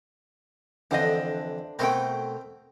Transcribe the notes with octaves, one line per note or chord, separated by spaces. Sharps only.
F2 D3 E3 D4 C5 D#5
B2 A3 C4 A#4 C5 G5